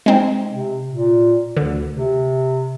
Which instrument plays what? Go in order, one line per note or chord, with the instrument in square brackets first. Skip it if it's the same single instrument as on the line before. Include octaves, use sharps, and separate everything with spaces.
[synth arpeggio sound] G#3 C4 D#4
[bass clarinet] C3
A#2
[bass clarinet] D2 [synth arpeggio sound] D3
[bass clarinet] C3